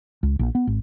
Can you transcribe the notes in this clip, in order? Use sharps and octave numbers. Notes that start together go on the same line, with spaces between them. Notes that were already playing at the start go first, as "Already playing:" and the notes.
C#2
A#1
B3
G#1